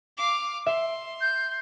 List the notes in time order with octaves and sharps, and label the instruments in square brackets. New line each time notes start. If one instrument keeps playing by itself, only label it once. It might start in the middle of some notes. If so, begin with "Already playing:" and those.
[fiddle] F5 D6
[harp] E5 [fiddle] C6
[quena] G6